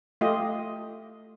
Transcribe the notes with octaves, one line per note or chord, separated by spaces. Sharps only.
A3 F4 G4 D#5